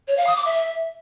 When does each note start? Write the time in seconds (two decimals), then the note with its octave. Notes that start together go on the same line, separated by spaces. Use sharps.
0.08 C#5
0.17 F5
0.27 D#6
0.36 D6
0.46 E5